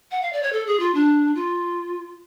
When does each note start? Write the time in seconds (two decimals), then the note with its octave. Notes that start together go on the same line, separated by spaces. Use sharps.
0.11 F#5
0.22 F5
0.33 D5
0.43 C#5
0.53 A4
0.67 G#4
0.80 F4
0.94 D4
1.35 F4